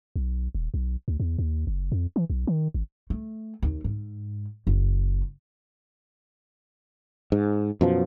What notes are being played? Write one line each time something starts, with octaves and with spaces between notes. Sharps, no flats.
B1
D#1
B1
D2
E2
D#2
F#1
F2
E3
B1
D#3
G#1
A3
D#2
G#2
F#1
G#2
F#2 B2 F3